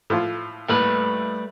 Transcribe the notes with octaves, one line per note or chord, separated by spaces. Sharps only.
A2 F3 F4
D#2 A2 G3 A3 B4